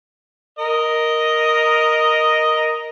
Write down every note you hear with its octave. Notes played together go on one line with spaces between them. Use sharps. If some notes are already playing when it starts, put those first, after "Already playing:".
A#4 D#5